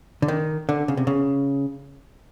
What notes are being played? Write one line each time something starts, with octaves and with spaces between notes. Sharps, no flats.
D3
D#3
D3
C#3
C3
C#3